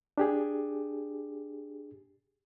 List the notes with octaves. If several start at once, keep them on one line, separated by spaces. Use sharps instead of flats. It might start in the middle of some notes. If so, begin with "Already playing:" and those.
D4 G4 G#4